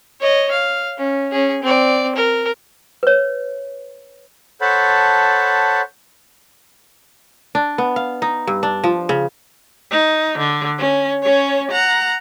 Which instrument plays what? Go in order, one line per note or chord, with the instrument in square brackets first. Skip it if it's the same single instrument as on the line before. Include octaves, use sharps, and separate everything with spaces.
[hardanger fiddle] C#5 D#5
F5
C#4
C#4 G#4
C4 D5
A#4
[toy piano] B4 C#5
[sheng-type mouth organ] A4 C5 C#5 F#5 A5 B5
[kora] D4
B3
F5
D#4
G2
D4
F3
C#3
[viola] D#4
D3
C#4
C#4 C#5
F#5 A#5